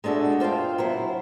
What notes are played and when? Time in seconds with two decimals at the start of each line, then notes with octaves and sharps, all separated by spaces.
0.04 G#3 A3 D4 F#4 A4
0.40 F4 C5 E5 F5 G5
0.78 F#3 E4 C5